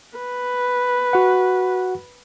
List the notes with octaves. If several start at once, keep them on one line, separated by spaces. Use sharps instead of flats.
B4
F#4 F#5